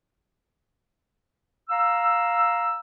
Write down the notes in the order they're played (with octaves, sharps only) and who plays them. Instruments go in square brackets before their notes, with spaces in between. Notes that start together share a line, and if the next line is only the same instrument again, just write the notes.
[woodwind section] F5 A#5 E6